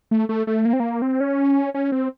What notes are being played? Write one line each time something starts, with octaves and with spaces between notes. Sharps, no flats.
A3
A3
A3
A#3
C4
A#3
C4
C#4
C#4
C4